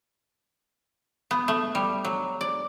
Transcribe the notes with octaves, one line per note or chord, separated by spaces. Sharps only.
B3
A3
G3
F#3
D5